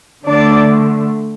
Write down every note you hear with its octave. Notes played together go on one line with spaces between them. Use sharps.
D3 A3 D4 D5